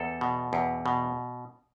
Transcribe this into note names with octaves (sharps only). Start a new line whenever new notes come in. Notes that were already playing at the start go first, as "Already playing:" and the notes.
Already playing: E2 A4
B2
E2
B2